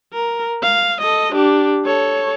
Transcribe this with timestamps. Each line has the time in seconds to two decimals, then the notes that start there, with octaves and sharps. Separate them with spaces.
0.13 A#4
0.63 F5
1.01 A4 D#5
1.33 D4 G4
1.85 A4 C#5